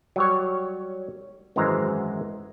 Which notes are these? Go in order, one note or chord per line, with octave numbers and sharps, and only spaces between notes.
F#3 G3 C#5
G#1 F#2 E3 G#3 C5 A#5